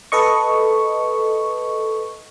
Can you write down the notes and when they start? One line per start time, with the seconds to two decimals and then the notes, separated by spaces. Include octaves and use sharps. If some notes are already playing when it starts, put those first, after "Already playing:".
0.12 A4 B4 D#5 C#6